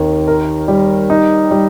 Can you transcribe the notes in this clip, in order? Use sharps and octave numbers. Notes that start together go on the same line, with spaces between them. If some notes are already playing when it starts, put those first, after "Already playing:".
Already playing: D#2 D#3 C4
A#4
G3
D#4
G3